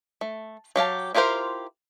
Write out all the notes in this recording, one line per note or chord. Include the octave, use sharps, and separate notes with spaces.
A3
F#3 G4 F5 A5
E4 F4 G4 A#4 C5